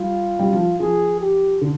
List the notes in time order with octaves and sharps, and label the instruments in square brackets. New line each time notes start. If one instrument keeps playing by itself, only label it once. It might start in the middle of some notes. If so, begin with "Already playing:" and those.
Already playing: [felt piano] G3 [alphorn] F4
[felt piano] G3
F3
[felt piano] F3 [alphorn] G#4
[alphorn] G4
[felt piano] D3